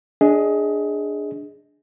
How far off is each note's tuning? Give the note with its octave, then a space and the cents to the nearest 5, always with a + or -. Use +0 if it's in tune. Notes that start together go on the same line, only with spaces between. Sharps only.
D4 +0 G#4 +0 D#5 +25